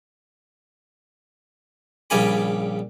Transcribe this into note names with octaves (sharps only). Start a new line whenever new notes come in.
A#1 C#3 G3 G4 G#5 B5